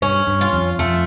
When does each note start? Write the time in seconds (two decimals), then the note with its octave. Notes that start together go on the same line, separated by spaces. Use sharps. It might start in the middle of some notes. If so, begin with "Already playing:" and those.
0.02 G2 C#4
0.27 G2
0.41 F4
0.53 F2
0.79 F2 A3